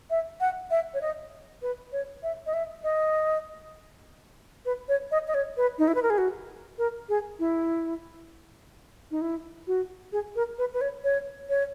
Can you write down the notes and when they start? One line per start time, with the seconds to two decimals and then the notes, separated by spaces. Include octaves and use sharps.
0.10 E5
0.40 F#5
0.71 E5
0.94 C#5
1.01 D#5
1.62 B4
1.92 C#5
2.23 E5
2.46 D#5
2.53 E5
2.83 D#5
4.65 B4
4.89 C#5
5.11 D#5
5.28 D#5
5.34 C#5
5.57 B4
5.78 D#4
5.87 E4
5.95 B4
6.03 A#4
6.10 G#4
6.18 F#4
6.78 A#4
7.09 G#4
7.39 E4
9.11 D#4
9.21 E4
9.67 F#4
10.12 G#4
10.36 A#4
10.58 B4
10.73 B4
10.81 C#5
11.04 C#5
11.49 C#5